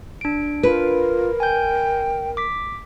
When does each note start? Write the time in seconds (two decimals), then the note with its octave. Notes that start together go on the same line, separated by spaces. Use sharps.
0.21 D4 D7
0.63 F4 A#4 B4
1.40 G5 G#5 G6
2.37 D6 B6